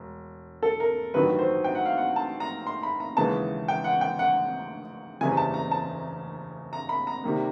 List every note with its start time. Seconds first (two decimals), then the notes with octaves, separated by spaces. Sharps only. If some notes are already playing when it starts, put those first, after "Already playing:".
Already playing: E1
0.63 A4
0.80 A#4
1.14 A1 G2 D#3 F#3 B4
1.39 C5
1.64 G5
1.75 F#5
1.86 F5
1.97 F#5
2.16 A5
2.40 A#5
2.67 C6
2.83 B5
3.00 A#5
3.17 D#2 C#3 E3 G#3 B3 A5
3.68 G5
3.84 F#5
4.01 G5
4.19 F#5
5.21 F#1 E2 C#3 E3 G3 G#5
5.37 A5
5.54 A#5
5.71 A5
6.73 A#5
6.89 B5
7.07 A#5
7.24 C3 D#3 G3 A#3